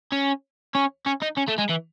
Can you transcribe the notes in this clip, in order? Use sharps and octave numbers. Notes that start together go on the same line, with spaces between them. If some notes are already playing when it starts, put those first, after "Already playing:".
C#4
C#4
C#4
D#4
C#4
A3
G#3
E3